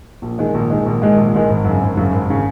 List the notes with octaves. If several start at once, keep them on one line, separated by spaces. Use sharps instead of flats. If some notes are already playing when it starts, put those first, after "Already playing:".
A#1
G#2 D#3 G#3
A#1
G#2 D#3 G#3
A#1
G#2 D#3 G#3
A#1
G#2 D#3 G#3
G#1
F#2
C#3
G#1
F#2 C#3
G#1
C#3